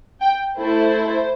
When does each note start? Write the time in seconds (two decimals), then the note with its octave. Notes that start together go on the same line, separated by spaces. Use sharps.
0.21 G5
0.58 A3 E4 A4 C5